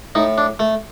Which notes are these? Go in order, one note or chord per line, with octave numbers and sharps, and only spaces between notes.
A2 D#4
D4
A3